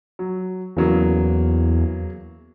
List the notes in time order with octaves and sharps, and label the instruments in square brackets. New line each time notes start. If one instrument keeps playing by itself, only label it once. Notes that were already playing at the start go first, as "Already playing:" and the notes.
[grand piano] F#3
[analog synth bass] E2 [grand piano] C#3 F#3 A#3